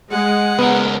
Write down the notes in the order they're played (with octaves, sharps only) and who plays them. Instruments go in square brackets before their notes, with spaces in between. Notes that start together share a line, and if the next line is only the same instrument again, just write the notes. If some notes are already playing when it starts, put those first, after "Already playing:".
[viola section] G#3 [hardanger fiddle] F#5
[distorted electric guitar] C#2 A#4 [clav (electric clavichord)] B3